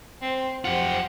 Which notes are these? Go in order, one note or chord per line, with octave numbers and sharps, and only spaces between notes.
C4 C5
F2 F#3 F4 G4 C5 F#5